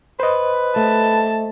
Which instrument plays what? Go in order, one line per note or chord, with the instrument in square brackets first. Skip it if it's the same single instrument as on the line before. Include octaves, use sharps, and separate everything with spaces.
[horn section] B4 [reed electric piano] C5 D#5
[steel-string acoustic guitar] A3 [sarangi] A5